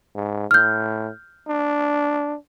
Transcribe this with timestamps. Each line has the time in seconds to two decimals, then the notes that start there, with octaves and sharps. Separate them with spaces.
0.16 G#2
0.51 A2 F6 G6
1.48 D4